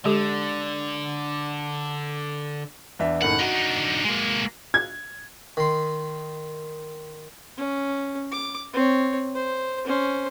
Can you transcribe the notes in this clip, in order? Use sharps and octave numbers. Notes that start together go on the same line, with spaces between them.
D3 G#3 G4 A4
E2 D4 E5
F#1 A2 D#3 F#5
D3 D#4 F#4 G7
G#3 A#3
G#6
D#3 C6
C#4
D6
C4 C#5
C5
C#4 C5